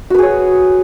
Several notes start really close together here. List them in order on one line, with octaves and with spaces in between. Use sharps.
F#4 B4 G#4 C#5